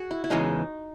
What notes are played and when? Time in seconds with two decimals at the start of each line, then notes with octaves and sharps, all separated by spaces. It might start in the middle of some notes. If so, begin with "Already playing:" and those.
Already playing: F#4 G#4
0.11 E4
0.24 E4
0.30 E2 C#3 E3 G#3 C#4 D#4